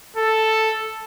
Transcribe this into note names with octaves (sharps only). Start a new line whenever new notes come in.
A4